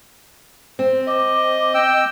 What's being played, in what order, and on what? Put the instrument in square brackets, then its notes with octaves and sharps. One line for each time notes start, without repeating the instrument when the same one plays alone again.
[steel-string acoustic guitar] C4 [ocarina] C5
[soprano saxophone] D#5 [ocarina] D6
[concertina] G5 E6